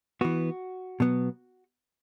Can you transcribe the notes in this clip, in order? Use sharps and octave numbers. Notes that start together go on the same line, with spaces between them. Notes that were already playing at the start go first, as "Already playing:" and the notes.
E3 B3 F#4
B2 F#3 B3